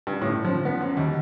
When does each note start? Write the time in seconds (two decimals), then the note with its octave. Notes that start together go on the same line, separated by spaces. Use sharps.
0.07 G2
0.22 A2
0.45 F3
0.65 B3
0.81 F#2
0.97 D#2